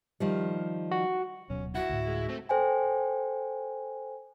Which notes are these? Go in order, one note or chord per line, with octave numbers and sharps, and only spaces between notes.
D#3 F3 G3
F#4
D1 B2 F#3 C#4
E4 F#4 F#5
D2 A2
G#3
A3 C4
A4 C5 G5 G#5